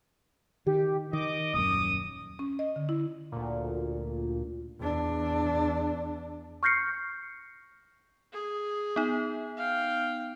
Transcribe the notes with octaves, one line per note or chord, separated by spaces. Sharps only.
D#3 G4
D#3 D#5 D6
D#1 F#2 D#6
C#4
D#5
D3
E4
D2 A#2
E2 D4
C#6 F6 G6 A#6 C7 C#7
G#4
B3 D#4
F5 G5